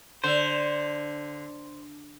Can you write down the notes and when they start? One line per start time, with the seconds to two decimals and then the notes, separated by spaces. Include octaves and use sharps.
0.24 D3 C5